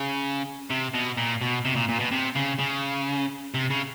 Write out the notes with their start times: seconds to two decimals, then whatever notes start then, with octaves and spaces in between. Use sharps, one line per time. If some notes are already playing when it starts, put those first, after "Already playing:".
Already playing: C#3
0.70 C3
0.94 B2
1.17 A#2
1.41 B2
1.65 C3
1.76 A#2
1.89 A#2
2.00 B2
2.12 C3
2.36 C#3
2.59 C#3
3.54 C3
3.70 C#3